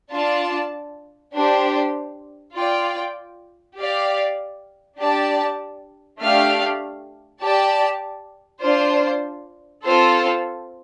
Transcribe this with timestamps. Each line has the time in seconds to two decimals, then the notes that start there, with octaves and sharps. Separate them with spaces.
0.12 D4 F4 D5 A5
1.34 D4 G4 C5
2.55 F4 D5 G5
3.76 G4 D5 F5
4.98 D4 G4 D5 A5
6.19 A3 D4 G4 F5
7.41 G4 D5 A5
8.62 D4 F4 C5
9.84 C4 F4 A4 C5